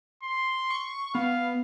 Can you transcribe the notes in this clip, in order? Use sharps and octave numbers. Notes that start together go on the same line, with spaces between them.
C6
C#6
B3 F5